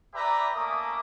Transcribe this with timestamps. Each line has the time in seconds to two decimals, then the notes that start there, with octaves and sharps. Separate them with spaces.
0.14 G4 B4 D5 E5 A#5
0.55 A3 A#3 C#4 E5 D6 D#6